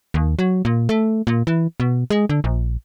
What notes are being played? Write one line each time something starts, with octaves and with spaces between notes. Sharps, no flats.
D#2
F#3
A#2
A3
A#2
E3
B2
G#3
D3
A#1